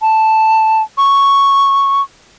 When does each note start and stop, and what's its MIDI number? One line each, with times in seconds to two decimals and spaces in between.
0.02 0.82 81
0.98 2.02 85